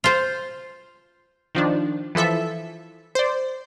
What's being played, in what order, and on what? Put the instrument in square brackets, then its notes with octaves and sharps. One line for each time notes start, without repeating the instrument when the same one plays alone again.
[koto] F4 C5
[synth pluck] D#3 F3 D4
E3 F3 A4 E5
C5 D5